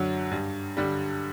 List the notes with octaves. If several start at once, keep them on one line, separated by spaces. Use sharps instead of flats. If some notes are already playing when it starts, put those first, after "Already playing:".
Already playing: F#2 D3 F#3
G2
D3 G3